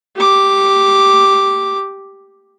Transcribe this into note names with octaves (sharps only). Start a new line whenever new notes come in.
G4 D6